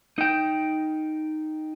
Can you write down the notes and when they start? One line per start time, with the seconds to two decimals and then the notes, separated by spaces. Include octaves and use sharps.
0.18 D#4 G5